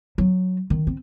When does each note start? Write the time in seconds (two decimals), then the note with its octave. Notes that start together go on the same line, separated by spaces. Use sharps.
0.18 F#3
0.70 D#3
0.87 C4